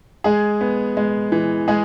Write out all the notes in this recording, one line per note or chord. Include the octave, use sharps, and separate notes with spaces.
G#3 G#4
B3
G#3
E3
G#3 G#4